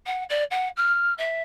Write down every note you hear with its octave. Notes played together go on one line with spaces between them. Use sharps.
F#5
D5
F#5
F6
E5